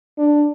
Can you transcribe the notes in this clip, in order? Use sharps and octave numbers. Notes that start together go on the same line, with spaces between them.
D4